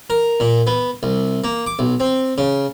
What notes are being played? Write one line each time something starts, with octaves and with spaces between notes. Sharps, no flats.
A#4
A#2
B3
C2
A#3
D6
B1
C4
C#3